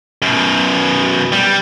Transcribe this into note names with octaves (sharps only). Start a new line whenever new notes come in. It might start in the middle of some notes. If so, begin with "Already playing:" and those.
F#2 B2
G3